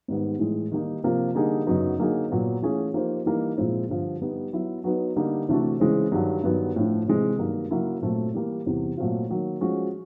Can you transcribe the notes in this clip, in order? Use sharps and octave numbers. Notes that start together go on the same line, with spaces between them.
G#2 D#3 G3 B3
A2 E3 G#3
D#3 G3 A#3 D#4
C3 F3 A#3
D3 G3 A#3 D#4 G#4
F#2 C#3 F#3 B3 D#4
D3 F#3 A#3 D#4 G#4
A#2 F#3 B3
E3 A3 C#4 F4 G#4
F3 A#3 D#4 G4 C5
E3 G3 A#3 D#4
A#2 F3 G#3 C4 E4
G2 D3 F3
G3 B3 D#4
F#3 B3 E4
F#3 B3 D#4 F#4 B4
D3 G3 A#3 D#4
C3 E3 A3 D4 F#4
C#3 E3 G#3 C4
G2 D#3 F#3
G2 D#3 F#3 B3
A2 F3 A3 D4
C3 E3 G#3 C4
G2 D#3 F#3 A#3
C#3 F#3 A#3 C#4 E4
A#2 F#3 A3 C4
E3 G3 A#3
E2 C3 E3 G3
A#2 F#3 A3 C4 F4
D#3 F#3 A#3
F3 G#3 C#4 F#4